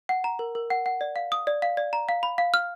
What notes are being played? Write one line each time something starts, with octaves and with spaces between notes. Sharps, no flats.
F#5
A#5
A#4
A#4
F#5
F#5
D5
F5
D#6
D5
F5
D5
A#5
F5
B5
F5
F6